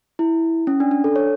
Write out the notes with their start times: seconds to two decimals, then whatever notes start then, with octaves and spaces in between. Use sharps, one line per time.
0.19 E4
0.67 C#4
0.80 D4
0.91 D4
1.04 A4
1.16 C#5